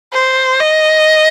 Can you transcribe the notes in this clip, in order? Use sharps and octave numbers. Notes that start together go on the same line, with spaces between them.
C5
D#5